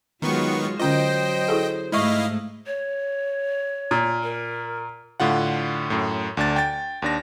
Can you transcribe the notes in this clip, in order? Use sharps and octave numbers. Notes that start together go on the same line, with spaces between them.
D#3 F#3 G#3 B3 F4 C#6
D3 F#3 C#4 F4 C5 D#5 G5
E4 G#4 A4
G#2 G#3 A3 E4 D#5 F5 C#6
C#5
A#2
A#4
A2 D3 F4 F#5
F#2 A2
D2 D4 A6
G5 A6
D#2 D4 A#6